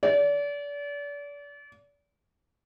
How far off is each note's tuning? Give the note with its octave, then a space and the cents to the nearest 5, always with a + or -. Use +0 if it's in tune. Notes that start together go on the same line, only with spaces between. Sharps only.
D5 -35